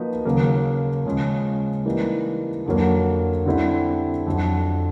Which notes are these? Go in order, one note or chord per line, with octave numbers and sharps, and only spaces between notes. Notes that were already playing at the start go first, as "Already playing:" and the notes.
Already playing: F3 A#3 D#4 F#4 B4
D#2 C#3 F#3 A#3
C#3 F3 G#3 C#4
E3 G3 A#3 D#4
F2 D3 F#3 A#3
D3 G3 C4 E4
F2 D3 F#3